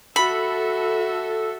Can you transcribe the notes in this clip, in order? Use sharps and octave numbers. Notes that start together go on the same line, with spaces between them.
F#4 A4 E5 B5